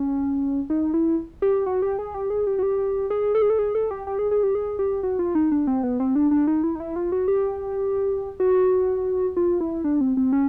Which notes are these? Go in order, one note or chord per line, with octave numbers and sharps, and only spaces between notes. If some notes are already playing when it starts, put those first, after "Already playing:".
Already playing: C#4
D#4
E4
G4
F#4
G4
G#4
G4
G#4
G4
F#4
G4
G#4
A4
G#4
A4
G#4
A4
G4
G4
G#4
G#4
G4
G#4
G4
F#4
F4
D#4
D4
C4
B3
C4
D4
D4
D#4
E4
D#4
E4
F4
F#4
G4
F#4
F4
E4
D4
C4
C4
C#4